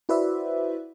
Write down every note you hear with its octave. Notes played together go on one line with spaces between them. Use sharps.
E4 F#4 B4 C5 D5 E5